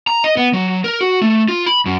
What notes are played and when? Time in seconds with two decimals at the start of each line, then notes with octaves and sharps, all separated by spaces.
0.07 A#5
0.24 D#5
0.37 B3
0.53 F#3
0.84 A#4
1.01 F#4
1.22 A3
1.48 F4
1.66 B5
1.86 F#2